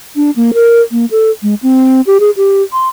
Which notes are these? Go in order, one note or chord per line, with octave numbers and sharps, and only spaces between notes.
D4
A#3
A#4
A#3
A4
G#3
C4
G4
G#4
G4
C6